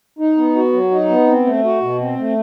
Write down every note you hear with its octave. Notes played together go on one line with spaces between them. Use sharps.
D#4
B3
F#4
F#3
D#4
B3
C4
A3
F#4
B2
C4
A3